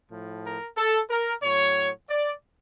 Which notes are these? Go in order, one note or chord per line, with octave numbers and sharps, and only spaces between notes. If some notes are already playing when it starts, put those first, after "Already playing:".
A2 F3
A#4
A4
A#4
A2 F#3 C#5
D5